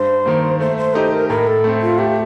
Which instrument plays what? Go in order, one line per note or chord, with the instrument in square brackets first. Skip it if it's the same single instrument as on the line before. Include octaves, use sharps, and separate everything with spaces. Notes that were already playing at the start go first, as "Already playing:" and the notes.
Already playing: [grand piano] G2 [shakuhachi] C5
[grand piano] D#3 A#3
[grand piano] A3 [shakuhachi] C5
[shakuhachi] C5
[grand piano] D#4 G4 [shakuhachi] A4
[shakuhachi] A#4
[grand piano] A2 [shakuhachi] A#4
[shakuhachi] A4
[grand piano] A3 C4
[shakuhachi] F4
[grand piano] A3 [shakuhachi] G4